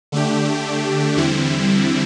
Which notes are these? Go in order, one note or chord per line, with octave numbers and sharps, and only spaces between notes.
D3 A3 D4 G4
E2 D3 G3 C4 E4